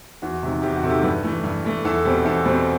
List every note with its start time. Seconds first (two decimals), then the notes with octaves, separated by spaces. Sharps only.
0.22 E2 F#4
0.43 C3 D#3
0.62 E2 G4
0.76 F#4
0.83 C3 D#3 A4
0.90 G4
1.03 G2 B4
1.24 E3 A3
1.44 G2
1.65 E3 A3
1.84 E2 A4
2.05 B2 G3 C4 G4
2.25 E2 A4
2.45 B2 G3 C4